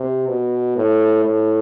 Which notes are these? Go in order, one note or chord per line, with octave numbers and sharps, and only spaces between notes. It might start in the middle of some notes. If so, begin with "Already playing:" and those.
Already playing: C3
B2
A2
A2